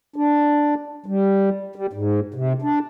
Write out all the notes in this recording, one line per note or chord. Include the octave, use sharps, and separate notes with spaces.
D4
G3
G3
G#2
C3
D4